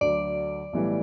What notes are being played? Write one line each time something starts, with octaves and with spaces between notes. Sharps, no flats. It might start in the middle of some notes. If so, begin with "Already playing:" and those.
D2 D3 F#3 D5
B1 A2 E3 G3